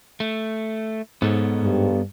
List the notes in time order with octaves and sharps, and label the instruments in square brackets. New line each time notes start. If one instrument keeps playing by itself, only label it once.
[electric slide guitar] A3
[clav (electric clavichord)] G#2 [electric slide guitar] B3 A4 C#5
[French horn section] G2